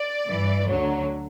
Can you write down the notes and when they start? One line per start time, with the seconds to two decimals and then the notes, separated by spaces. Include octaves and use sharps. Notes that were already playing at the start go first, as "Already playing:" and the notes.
Already playing: D5
0.28 G2 E3
0.68 D2 D3 F#3